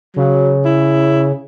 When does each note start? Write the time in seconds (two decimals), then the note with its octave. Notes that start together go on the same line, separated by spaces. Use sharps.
0.16 C#3 F#3
0.65 E4